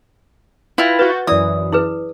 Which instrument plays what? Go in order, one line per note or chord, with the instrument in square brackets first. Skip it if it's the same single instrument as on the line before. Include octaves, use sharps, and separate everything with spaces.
[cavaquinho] E4 F4 [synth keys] B4 G5 A#6
[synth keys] F#4 G6 A6 [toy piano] B4
[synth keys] F#2 E3 [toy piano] D5 E5 [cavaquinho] D#6
[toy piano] E4 G#4 B4